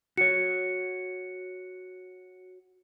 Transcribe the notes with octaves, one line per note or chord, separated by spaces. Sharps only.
F#4 C#5 C#7